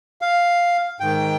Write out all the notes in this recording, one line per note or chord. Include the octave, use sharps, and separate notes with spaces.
F5
G#2 D#3 G5